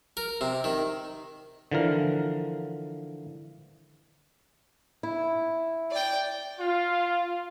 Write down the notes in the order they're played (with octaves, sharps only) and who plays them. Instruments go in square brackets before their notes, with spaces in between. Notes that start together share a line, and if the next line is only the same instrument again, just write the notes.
[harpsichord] A#4
C3
D#3
[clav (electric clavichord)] D3 E3 F3 A#4
[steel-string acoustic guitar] E4
[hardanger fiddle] D5 G5
[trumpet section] F4